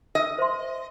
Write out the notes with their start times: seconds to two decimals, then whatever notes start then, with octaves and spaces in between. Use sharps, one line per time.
0.15 D#5
0.38 C5 E5 C6